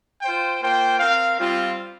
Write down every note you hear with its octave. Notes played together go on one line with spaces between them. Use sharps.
F4 C5 G5
A#3 F4 C5 G5
C4 A#4 F5
G3 C4 F4